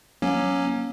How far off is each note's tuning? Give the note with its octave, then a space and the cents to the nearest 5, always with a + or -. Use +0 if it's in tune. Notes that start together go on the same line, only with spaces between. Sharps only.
F#3 +0 A#3 +30 C#4 +0